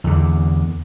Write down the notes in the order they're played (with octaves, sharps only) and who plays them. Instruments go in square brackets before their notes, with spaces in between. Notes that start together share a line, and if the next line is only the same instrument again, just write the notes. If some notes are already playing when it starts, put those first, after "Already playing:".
[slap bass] E2 D3